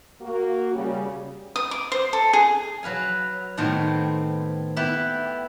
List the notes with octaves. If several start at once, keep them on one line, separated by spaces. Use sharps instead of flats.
A#3 F#4
C#3 G3
D#6
D6
C5
A4
G#4
F#3 B4 F5 G#5
A2 D#3 B3 C4 C5
B3 E4 G4 B4